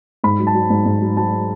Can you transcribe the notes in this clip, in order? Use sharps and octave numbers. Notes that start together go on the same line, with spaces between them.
G#2 B5
F#3
A5
F#3
G#2
G#2
F#3
F#3 A5